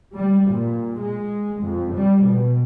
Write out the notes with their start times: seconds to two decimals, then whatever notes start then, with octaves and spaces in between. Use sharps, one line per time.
0.14 G3
0.50 A#2
0.99 G#3
1.62 F2
1.93 G3
2.25 B2